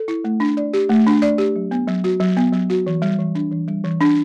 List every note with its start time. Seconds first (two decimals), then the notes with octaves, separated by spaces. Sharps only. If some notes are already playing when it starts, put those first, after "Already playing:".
Already playing: A4
0.08 E4
0.24 A3
0.40 D4
0.57 D5
0.73 G4
0.89 A3
1.07 D4
1.22 D5
1.38 G4
1.56 F#3
1.71 B3
1.88 F#3
2.04 F#4
2.20 F#3
2.37 B3
2.53 F#3
2.70 F#4
2.87 E3
3.02 G3
3.19 E3
3.35 D4
3.52 E3
3.68 G3
3.84 E3
4.01 D4